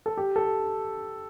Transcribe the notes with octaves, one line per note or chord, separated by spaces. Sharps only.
A4
G4
A4